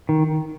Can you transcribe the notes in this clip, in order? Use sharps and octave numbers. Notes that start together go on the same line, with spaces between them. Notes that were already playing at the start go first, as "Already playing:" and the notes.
D#3